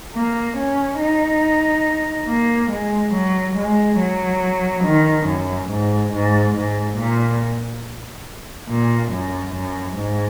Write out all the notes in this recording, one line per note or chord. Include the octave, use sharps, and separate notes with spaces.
A#3
C#4
D#4
A#3
G#3
F#3
G#3
F#3
D#3
F#2
G#2
G#2
G#2
A#2
A#2
F#2
F#2
G#2